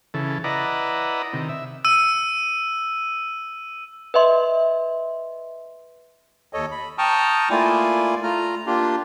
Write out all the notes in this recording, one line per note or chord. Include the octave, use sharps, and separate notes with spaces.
C#3 E3 A4
E4 B4 D5 D#5 F#5 A#5
C3 D#3
E5
E6 D#7
B4 D#5 E5 C6
D#2 A4 C#5 D#5
B5
G5 A5 A#5 C#6 D#6 F6
A3 A#3 E4 F4 D5 G#5
A3 F4 A#5 F6
A#3 D4 F4 G4